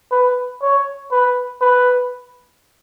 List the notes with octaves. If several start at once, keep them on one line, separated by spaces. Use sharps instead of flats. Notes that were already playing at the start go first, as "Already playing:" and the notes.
B4
C#5
B4
B4